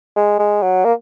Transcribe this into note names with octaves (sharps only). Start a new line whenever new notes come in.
G#3
G#3
F#3
A#3